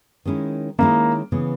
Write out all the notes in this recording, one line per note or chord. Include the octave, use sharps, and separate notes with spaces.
D#3 G#3 C#4 E4
D#3 G#3 A#3 C#4 E4
C#3 E3 B3